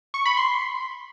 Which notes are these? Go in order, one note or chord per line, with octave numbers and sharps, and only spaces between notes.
C#6
B5
C6